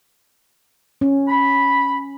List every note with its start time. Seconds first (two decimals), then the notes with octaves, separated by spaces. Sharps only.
1.01 C#4
1.28 B5